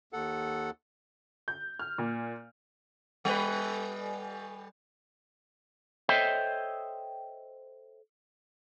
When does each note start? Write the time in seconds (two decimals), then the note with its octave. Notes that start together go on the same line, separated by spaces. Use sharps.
0.13 D#2 A4 F#5
1.48 G6
1.79 F6
1.98 A#2
3.25 G3 B4
6.09 A4 C5 C#5 D#5 E5 G5